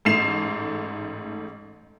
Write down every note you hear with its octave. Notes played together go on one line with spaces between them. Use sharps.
A1 G#2 A3 C7 E7 F7